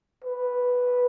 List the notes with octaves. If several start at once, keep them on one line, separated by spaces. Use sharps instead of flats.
B4